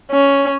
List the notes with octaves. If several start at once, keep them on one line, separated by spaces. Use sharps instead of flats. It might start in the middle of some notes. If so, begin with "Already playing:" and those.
C#4